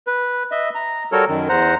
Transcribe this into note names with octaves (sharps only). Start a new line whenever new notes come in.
B4
D#5 E5
A#5
G3 F#4 A4 A#4 C#5
F#2 D#3
E2 C5 F#5 A#5